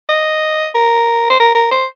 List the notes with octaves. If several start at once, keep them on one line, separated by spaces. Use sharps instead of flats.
D#5
A#4
C5
A#4
A#4
C5